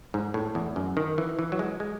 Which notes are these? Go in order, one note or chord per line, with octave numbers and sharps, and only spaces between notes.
G#2
A2
E2
F#2
D#3
E3
E3
F#3
G#3
G#3